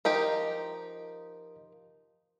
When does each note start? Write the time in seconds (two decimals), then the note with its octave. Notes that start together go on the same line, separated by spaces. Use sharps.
0.05 F3 D#4 G4 A#4 D#5